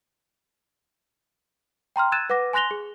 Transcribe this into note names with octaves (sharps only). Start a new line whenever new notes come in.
G5 A#5 C6 F6
E6 F#6 G#6 A6 D#7 E7
B4 F#5 D6 A#6
G#5 C6 F#6 A#6 F7 G7
G#4